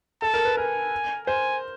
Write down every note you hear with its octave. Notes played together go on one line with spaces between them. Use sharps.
A4 A5
A#4
B4
A#4 G#5
C5 G#5